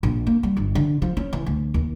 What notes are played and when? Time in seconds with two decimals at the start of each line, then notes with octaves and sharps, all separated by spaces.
0.03 A#1
0.27 A#3
0.43 G3
0.57 G1
0.75 D3
1.02 F3
1.17 C#4
1.33 E3
1.46 D2
1.74 D#2